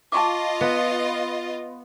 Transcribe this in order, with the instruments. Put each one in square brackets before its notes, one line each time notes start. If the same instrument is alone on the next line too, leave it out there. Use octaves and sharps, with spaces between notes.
[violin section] F4 D#5 [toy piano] A5 C#6 D6
[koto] B3